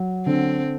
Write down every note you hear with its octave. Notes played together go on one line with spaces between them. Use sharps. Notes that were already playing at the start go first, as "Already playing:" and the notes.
Already playing: F#3
D3 C4